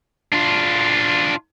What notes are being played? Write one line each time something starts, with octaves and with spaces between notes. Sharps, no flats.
D4 F4